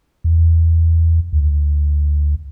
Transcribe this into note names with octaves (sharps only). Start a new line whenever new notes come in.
E2
D2